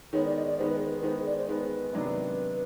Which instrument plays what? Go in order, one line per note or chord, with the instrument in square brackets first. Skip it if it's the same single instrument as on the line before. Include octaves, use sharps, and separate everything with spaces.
[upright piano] D#3 G#3 B3 [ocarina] C#5
[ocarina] D5
D#5
D5
[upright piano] D#3 G#3 B3 [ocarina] C5
[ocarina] B4
B4
B4
[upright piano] D#3 G#3 B3 [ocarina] C5
[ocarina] D5
C5
[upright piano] D#3 G#3 B3 [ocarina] B4
[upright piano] C3 D#3 F#3 B3 D4